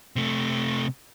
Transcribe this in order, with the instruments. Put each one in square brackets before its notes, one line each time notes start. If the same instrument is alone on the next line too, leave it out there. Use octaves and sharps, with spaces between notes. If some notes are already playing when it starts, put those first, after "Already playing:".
[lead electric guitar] C3 A3